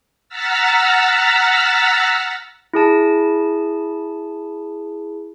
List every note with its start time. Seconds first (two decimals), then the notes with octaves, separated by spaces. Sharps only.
0.29 F#5 A#5 E6 F6 A6 B6
2.73 E4 G#4 A5